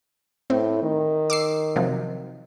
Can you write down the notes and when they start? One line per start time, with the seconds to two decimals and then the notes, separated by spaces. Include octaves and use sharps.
0.50 A2 C4
0.83 D#3
1.30 D6 E6 C7
1.76 C3 F3 F#3